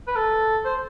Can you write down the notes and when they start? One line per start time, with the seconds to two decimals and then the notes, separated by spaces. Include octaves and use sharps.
0.07 B4
0.16 A4
0.65 C5